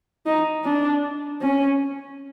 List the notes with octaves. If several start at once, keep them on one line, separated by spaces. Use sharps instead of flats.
D#4
D4
C#4